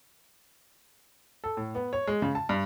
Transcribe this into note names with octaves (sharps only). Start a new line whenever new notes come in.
A4
A2
B3
C#5
G#3
C#3
A5
G2